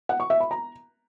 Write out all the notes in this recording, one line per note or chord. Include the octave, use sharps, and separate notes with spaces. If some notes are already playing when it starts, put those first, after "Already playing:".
F#5
C#6
E5
B5
A#5